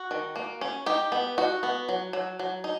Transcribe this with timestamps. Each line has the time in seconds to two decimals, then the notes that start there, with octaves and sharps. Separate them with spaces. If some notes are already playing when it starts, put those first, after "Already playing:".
Already playing: F#4
0.11 D#3
0.36 A#3
0.61 C#4
0.86 D#4 G4
1.12 B3
1.38 D#4 F#4
1.63 B3
1.89 F#3
2.13 F#3
2.39 F#3
2.64 D#4